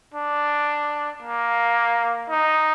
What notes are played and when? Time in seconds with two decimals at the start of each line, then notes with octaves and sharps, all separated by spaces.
0.14 D4
1.22 A#3
2.30 D#4